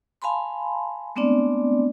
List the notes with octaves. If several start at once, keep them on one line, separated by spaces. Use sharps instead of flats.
F5 G#5 A5 B5 C6
G#3 A3 B3 C4 D4 D5